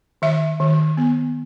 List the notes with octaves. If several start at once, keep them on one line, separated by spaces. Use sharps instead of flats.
D#3 E5
D#3
B3